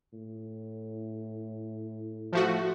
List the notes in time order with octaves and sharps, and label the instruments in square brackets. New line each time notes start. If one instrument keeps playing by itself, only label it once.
[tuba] A2
[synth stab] F3 A3 F#4